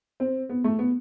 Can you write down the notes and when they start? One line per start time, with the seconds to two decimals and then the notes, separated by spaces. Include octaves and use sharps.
0.20 C4
0.49 B3
0.64 A3
0.79 B3